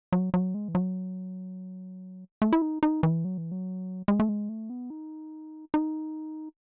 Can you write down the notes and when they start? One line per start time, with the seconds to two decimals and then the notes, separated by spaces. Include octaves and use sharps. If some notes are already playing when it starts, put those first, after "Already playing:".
0.12 F#3
0.34 F#3
0.54 G#3
0.68 E3
0.75 F#3
2.42 A3
2.53 E4
2.62 D#4
2.83 D#4
3.03 E3
3.25 F#3
3.38 E3
3.52 F#3
4.08 G#3
4.20 A3
4.29 G#3
4.49 A3
4.70 B3
4.90 D#4
5.74 D#4